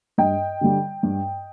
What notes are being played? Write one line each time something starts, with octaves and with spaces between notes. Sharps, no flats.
G2 D#5 G5
D3 G3
G2